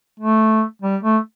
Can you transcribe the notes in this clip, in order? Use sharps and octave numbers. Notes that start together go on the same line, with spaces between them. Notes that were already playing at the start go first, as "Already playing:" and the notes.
A3
G3
A3